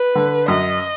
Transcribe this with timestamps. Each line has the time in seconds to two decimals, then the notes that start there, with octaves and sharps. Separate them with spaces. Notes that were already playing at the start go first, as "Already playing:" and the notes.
Already playing: B4
0.15 D3
0.48 F#2 D#5